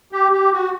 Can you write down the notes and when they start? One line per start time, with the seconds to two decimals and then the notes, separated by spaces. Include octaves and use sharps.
0.12 G4
0.32 G4
0.52 F#4